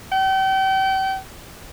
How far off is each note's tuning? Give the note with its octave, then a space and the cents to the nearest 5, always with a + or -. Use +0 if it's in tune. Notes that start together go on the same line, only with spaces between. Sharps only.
G5 -35